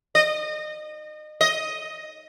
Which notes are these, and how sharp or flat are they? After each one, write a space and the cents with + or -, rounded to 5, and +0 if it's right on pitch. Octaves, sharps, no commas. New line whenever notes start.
D#5 -30
D#5 +0